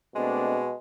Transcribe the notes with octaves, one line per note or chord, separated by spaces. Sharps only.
B2 G#3 A3 C4 D4